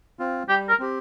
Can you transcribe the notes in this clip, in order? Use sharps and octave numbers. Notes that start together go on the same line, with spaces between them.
C4 F4
G3 G4
A#4
C4 G4